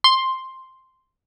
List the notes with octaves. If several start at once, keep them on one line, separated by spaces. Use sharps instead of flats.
C6